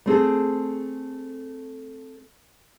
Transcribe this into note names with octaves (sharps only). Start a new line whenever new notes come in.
A3 C4 G#4 A4